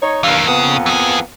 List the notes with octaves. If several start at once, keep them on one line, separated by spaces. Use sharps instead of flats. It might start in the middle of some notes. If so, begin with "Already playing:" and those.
D#4 C#5
G2 E3 A#3 F5
F2 C#3 A#3 B3
E3 G#4